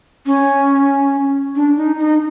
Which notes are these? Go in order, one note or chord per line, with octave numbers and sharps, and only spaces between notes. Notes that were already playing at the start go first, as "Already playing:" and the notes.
C#4
D4
D#4
D#4